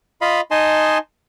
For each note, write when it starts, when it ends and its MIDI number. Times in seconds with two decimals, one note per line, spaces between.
0.21 0.41 65
0.21 0.41 75
0.21 0.41 77
0.21 0.41 83
0.51 0.98 63
0.51 0.98 75
0.51 0.98 80
0.51 0.98 81
0.51 0.98 84